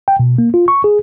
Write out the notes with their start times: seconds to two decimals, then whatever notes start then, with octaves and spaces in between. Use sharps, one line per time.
0.08 G5
0.20 B2
0.38 A#3
0.54 F4
0.68 C#6
0.84 G#4